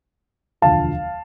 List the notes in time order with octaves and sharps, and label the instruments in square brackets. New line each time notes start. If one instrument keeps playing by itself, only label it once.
[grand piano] E1 D2 D3 F3 F5 A5